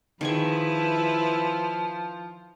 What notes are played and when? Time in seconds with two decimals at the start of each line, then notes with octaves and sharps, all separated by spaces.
0.21 D#3 F3 E4 G#4 B4 C#6